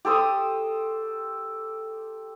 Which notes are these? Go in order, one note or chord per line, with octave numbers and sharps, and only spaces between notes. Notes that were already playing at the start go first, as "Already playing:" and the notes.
G4 A4 C5 D#6